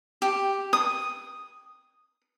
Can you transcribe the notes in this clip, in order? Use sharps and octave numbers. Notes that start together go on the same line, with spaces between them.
G4
D#6